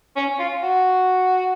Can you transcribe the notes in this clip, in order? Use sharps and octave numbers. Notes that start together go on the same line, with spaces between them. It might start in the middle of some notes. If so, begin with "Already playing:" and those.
C#4
F4
F#4